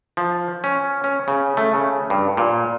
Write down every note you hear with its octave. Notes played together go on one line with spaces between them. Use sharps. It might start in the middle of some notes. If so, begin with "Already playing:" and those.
F3
C#4
C#4
C#3
A3
C#3
G2
A#2